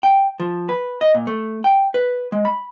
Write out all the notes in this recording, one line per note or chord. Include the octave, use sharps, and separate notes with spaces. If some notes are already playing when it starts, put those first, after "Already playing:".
G5
F3
B4
D#5
A#2
A3
G5
B4
G#3
B5